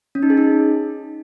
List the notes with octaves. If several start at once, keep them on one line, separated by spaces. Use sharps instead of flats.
C#4
D#4
G#4
D#4